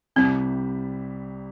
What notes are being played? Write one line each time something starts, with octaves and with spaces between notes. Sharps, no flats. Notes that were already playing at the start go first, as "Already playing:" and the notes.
C2 C3 G3 C4 E4